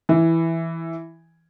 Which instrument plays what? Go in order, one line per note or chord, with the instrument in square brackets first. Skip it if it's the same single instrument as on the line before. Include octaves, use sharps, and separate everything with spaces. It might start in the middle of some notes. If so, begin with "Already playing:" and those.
[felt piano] E3